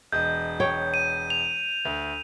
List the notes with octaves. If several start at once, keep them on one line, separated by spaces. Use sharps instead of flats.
E1 D#5 G6
C#5 G5
D#7
F7
D2